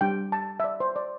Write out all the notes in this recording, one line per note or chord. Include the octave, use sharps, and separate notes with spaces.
G3 D4 G4 G5
A5
E5
D5
C5
D5